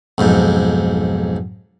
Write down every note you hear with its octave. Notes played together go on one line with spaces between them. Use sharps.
B1 F2 G#2